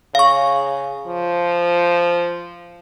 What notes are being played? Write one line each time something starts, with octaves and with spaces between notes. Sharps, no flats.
C#3 F5 C#6
F3